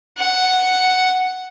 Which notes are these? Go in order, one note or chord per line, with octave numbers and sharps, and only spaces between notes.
F#5